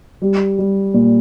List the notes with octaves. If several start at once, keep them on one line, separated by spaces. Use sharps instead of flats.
G3
G3
A#2